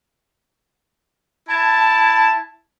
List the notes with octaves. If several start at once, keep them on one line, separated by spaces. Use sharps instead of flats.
E4 A5